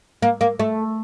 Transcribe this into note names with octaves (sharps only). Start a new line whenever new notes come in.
A#3
A#3
A3